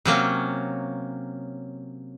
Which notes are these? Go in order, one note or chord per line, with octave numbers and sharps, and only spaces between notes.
C3 F#3 A#3 C#4